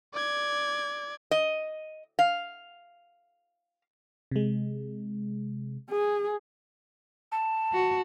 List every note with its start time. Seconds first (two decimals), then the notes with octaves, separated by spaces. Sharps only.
0.13 D5 G#6
1.31 D#5
2.19 F5
4.31 C3 G#3
5.91 G#4
7.32 A5
7.73 F#4